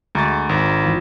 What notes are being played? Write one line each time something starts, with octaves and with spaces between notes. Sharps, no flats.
D2 G#3 A#5 C#6 A6
G#1
G1 E3 F4